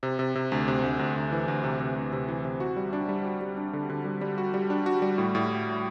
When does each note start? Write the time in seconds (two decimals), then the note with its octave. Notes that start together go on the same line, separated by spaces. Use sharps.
0.03 C3
0.19 C3
0.35 C3
0.52 D2
0.68 C3
0.83 D2
0.99 D2
1.16 D2
1.32 E3
1.48 D2
1.64 C3
1.80 C3
1.96 D2
2.13 C3
2.29 E3
2.45 C3
2.60 F#4
2.76 G3
2.93 D4
3.09 G3
3.25 F#4
3.41 G3
3.57 D4
3.73 D3
3.90 D3
4.05 G3
4.21 G3
4.38 F#4
4.54 G3
4.70 D4
4.86 F#4
5.02 G3
5.18 A2
5.35 A2